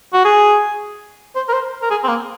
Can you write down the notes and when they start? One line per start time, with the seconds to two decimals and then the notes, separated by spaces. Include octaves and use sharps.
0.14 F#4
0.25 G#4
1.36 C5
1.49 A#4
1.53 C5
1.83 A#4
1.90 G#4
2.04 C4
2.08 A#3